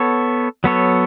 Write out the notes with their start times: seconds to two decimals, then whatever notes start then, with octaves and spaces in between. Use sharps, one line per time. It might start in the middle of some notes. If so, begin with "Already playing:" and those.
Already playing: B3 A4 C#5
0.64 F#3 B3 A4 C#5